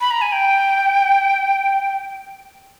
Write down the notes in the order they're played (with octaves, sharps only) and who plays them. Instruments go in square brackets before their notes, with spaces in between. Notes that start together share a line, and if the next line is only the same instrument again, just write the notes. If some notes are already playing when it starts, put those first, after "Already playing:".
[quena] B5
A#5
G#5
G5